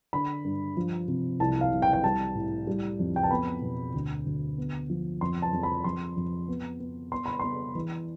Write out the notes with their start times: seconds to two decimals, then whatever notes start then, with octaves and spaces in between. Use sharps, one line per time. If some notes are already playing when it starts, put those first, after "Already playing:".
0.13 D3 B5
0.44 G2
0.77 F3
1.08 C3
1.40 C2 A5
1.61 F5
1.72 C2
1.82 G5
1.93 G5
2.03 G3 A5
2.35 A2
2.67 G3
2.99 F2
3.16 G5
3.23 A5
3.31 B3 B5
3.62 B2
3.94 D2
4.26 D2
4.58 B3
4.90 F3
5.21 F2 C6
5.42 A5
5.53 F2
5.63 B5
5.84 F2 C6
6.16 F2
6.48 B3
6.80 B3
7.12 B3 C6
7.26 B5
7.39 B3 C6
7.75 E3